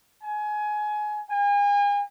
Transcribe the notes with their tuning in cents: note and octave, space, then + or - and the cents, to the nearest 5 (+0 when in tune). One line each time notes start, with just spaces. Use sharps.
G#5 +25
G#5 -40